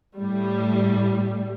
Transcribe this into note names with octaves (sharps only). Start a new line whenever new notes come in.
A2 G3